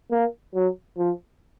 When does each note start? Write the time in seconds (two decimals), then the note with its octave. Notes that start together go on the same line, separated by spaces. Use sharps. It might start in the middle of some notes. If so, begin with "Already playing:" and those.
0.11 A#3
0.54 F#3
0.98 F3